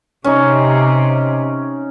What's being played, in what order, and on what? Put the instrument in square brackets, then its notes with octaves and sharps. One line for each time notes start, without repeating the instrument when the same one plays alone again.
[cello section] C3 [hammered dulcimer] C#4 D#4